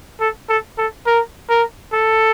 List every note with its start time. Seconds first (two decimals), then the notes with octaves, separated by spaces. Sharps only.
0.21 A4
0.49 A4
0.78 A4
1.07 A#4
1.50 A#4
1.93 A4